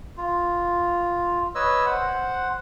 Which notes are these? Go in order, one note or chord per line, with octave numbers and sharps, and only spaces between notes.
F4
B4 C#5 D#5 E6
C5 F#5